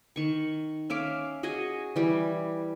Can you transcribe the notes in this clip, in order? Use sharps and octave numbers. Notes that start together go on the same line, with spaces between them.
D#3 C#6
C#4 E5 F5 D6
F#4 G#4 D#5 G#5
E3 G3